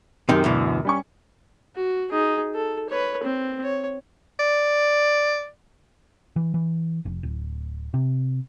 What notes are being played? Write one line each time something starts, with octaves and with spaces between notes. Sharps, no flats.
F#2 C3 D#3
D2 B2 E3
G3 C#4 C#6
F#4
D#4 G#4
A4
B4 C#5
C4
C#5
D5
E3
E3
F1
D1
C3